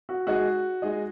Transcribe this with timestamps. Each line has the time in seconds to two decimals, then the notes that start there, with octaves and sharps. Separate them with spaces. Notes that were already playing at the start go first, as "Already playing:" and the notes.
0.09 F#4
0.27 G#3 D#4 F#4 G#4 D#5
0.82 G#3 D#4 G#4 D#5